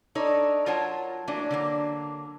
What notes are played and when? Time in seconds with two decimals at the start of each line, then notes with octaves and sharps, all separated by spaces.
0.15 D4 D#4 A4 C#5
0.66 F#3 F4 A#4 C#5 F#5 A5
1.28 E3 F#3 A3 A#3 D4
1.51 D3 F#3 A#3